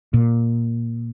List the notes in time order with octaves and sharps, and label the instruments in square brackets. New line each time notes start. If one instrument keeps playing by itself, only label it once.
[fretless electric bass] A#2